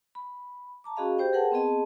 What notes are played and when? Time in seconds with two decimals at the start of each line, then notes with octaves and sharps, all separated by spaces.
0.15 B5
0.84 A5 A#5 D6
0.96 C#4 F#4 G#4 D#5 F5 B5
1.18 G4 C5 G5
1.33 G#4 A#4 B4 F#5 G5 A5
1.52 B3 C4 G#4 D#5 A5